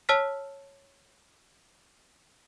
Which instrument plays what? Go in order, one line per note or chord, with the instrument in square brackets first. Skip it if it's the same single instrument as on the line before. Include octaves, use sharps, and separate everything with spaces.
[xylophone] C#5 A5 E6 F6 B6